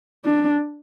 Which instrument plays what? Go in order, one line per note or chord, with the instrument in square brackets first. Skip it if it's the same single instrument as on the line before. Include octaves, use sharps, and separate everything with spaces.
[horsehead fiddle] D4